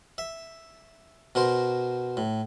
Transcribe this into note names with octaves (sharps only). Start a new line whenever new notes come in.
E5
B2 A#4 C5
A2